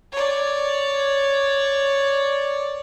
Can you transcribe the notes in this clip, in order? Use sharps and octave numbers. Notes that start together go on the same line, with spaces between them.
C#5 D5